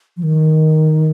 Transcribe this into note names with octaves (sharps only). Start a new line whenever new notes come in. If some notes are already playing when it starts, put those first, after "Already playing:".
F3
D#3